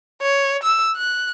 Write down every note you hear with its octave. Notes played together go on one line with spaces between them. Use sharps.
C#5
E6
F#6